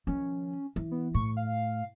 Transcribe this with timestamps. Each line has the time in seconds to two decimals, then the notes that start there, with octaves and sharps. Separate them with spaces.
0.07 D#3 F3 C#4
0.76 E3
0.91 B3
1.14 A2 C#6
1.37 F5